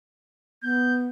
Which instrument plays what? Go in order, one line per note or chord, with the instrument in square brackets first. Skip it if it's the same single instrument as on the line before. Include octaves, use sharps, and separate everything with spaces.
[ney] B3 [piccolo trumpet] G6